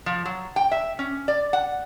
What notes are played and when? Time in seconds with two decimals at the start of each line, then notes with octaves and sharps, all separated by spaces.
0.06 F3
0.25 F#3
0.56 G5
0.71 E5
0.99 C#4
1.28 D5
1.53 F#5